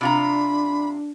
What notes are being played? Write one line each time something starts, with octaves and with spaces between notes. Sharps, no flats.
C3 D4 F4 A#5 B5